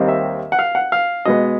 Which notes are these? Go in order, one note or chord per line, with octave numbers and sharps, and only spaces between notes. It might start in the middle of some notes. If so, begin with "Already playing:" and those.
Already playing: D#2 D#3 G3 C4
E5
F#5
F5
F#5
F5
B2 G#3 B3 D#5